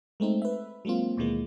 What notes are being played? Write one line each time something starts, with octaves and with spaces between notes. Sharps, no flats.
G#3 A3 C4 D#4
B4 E5
F#3 G#3 A#3 C4 F4
D#2 B2 E3 G#3 A#3